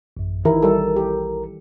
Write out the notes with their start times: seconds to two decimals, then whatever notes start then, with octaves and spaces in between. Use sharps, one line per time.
0.17 A1 F#2
0.45 A#1 D#3 E3 E4 A#4 A#5
0.63 G3 A4
0.96 G4